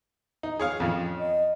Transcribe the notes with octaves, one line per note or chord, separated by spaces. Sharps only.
D#4
G#4 C#5 F5
F2 F3 C#4
D#5